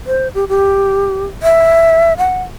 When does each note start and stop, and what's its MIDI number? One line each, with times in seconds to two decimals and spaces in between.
0.07 0.28 72
0.35 0.44 67
0.49 1.25 67
1.43 2.17 76
2.18 2.42 78